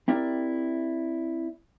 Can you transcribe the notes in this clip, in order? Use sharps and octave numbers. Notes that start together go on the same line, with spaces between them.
C4 E4 G4 A#4 D5 E5